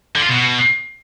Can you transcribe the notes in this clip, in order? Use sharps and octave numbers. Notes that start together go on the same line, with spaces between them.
D3
F4
B2